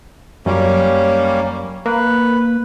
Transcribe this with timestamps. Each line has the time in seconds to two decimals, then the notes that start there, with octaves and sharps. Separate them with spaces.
0.46 F#2 G3 A#3 C#4
1.86 A#3 B4